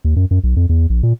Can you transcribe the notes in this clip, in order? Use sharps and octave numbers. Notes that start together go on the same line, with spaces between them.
D#2
F#2
F#2
B1
F2
E2
A#1
A#2